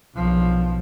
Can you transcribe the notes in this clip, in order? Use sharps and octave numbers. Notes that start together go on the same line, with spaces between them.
B1 F3